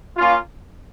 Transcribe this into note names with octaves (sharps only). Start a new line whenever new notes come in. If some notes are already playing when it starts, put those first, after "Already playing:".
A#3 C#4 F4